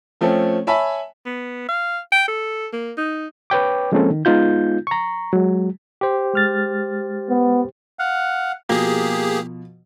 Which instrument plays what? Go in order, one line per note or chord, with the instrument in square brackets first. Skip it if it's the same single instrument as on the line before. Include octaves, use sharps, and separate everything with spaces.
[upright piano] F3 A3 C4 C#4 A4
C#5 E5 G#5 A5 B5
[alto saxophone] B3
F5
G5
A4
A#3
D#4
[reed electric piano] B4 C#5 G5 D6
F3 G#3 A#3 C4 C#4 A4
D#3
G#3 B3 D#4 F4 G6
A#5 C#6
F#3 G#3
[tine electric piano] G4 C5
[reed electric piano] G#3 F6 A6
[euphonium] B3
[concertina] F5 F#5
[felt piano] B2 F3 [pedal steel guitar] A#3 [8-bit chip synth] G4 G#4